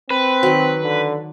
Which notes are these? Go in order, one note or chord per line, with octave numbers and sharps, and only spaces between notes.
C4 B4
D#3 F#3
D3